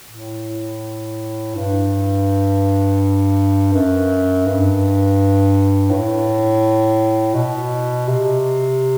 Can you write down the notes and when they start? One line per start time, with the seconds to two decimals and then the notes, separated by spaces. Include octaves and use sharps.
0.11 A2
1.55 G2
3.73 F#2
4.46 G2
5.90 A2
7.35 B2
8.08 C3